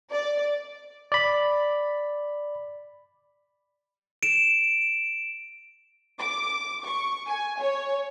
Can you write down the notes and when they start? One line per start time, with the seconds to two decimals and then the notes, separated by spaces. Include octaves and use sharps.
0.10 D5
1.12 D5 B5
4.23 D7 E7
6.18 D6
6.84 C#6
7.27 G#5
7.59 C#5